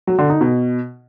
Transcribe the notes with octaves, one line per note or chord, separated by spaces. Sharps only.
F#3
D3
D#4
B2